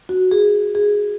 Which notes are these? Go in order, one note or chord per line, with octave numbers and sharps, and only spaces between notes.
F#4
G#4
G#4